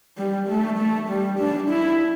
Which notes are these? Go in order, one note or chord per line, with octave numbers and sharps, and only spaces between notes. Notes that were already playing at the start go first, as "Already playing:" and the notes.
G3
A3
A3
G3
D4
E4